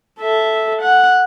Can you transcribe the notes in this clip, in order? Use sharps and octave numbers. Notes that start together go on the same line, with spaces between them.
A4 E5
F#5